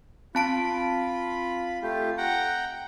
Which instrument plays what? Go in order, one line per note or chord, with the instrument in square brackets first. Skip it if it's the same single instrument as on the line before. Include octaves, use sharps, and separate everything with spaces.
[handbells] C4 A5 D7 [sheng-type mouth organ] F4 B5
[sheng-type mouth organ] A3 F4 G4
F#5 G5 A#5